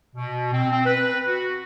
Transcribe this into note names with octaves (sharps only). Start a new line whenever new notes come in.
B2
C4
C4
B4
F#4